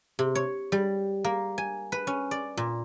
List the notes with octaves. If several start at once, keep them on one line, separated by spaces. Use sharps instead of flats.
C3
C#5
G3
A#3
G#5
B4
C#4
D5
A#2